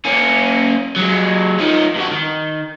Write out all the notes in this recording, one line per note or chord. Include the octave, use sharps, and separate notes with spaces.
A#3 C#4
F#3 G#3
F3 D#4
G2 F#4
D#3